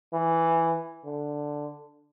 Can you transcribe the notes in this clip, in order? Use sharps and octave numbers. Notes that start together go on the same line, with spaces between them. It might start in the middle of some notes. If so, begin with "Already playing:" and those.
E3
D3